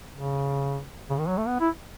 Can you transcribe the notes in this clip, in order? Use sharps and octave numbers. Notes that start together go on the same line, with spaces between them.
C#3
C#3
D#3
F#3
A3
B3
E4